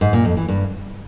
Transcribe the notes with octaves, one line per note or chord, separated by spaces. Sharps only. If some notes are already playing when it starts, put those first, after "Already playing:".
G#2
A#2
F2
E3
G2